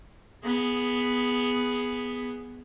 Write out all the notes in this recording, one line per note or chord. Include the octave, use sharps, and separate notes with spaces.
B3 G#4